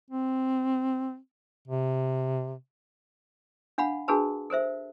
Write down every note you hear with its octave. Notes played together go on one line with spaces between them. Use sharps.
C4
C3
D4 F5 F#5 B5
D4 F#4 G#4 A#4 B4 A5
A4 A#4 C5 E5